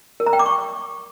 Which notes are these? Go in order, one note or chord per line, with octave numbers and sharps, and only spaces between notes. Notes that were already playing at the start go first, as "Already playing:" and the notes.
A#4
A#5
G5
D6
C#6